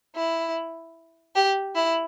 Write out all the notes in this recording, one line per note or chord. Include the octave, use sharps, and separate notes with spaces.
E4
G4
E4